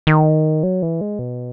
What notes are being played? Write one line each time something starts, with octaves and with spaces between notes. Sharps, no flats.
D#3
F#3
E3
G#3
B2